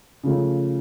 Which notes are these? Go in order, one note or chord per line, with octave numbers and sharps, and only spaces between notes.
C#3 F3 A3 C#4